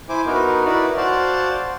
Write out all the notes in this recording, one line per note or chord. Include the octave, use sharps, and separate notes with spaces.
E4 C5 G#5 D6
B3 D#4 F#4 A#4
D#4 E4 F#4 A#4 B4 D5
F#4 C5 D5 F5 A5